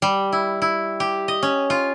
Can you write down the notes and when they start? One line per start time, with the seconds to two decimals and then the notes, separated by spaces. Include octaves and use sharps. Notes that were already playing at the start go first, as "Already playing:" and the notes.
0.02 G3
0.32 E4
0.62 E4
1.00 G4
1.28 D#5
1.43 C#4
1.70 F4